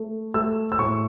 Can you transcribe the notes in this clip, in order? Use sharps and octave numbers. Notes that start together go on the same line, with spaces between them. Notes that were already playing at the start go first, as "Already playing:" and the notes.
Already playing: A3
A3 E6
E6
A2 C#6